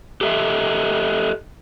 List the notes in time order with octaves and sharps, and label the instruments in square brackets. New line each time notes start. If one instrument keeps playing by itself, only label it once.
[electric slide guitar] G4 A4 D#5 E5